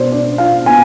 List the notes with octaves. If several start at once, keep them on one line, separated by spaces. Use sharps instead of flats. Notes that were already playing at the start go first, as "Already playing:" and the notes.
Already playing: B2 B3 C5 D5
D4 D5
F4 F5
B3 G#5